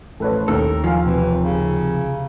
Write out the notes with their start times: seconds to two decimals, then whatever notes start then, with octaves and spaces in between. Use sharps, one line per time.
0.20 A1 F3 A4 B4 C#5
0.48 D#2 A2 A4 A#4 G5 E6
0.84 F3 F5 G#5
1.05 C3 E3
1.41 C#3